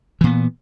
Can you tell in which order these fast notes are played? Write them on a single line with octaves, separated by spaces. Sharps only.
E3 A#2 B3